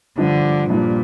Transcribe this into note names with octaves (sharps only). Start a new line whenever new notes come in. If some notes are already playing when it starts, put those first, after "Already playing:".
G2 D3 F3 D4
G2 A#2 F3 D4